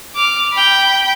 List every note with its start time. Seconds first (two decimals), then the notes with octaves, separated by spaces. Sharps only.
0.15 D6 F6
0.53 G5 B5